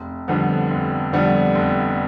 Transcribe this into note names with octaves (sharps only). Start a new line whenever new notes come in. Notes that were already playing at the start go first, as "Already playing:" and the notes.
Already playing: F1
F2 D3 G3 B3
F1
F2 D3 G3 B3
F1